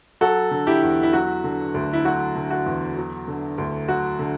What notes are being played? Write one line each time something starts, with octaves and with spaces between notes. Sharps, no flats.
F#3 F#4 A4
D3
E4 G4
E2
E4
F#3 F#4
D3
D2
E4
F#3 F#4
D3
F#4
E2
F#3
D3
D2
F#3 F#4
D3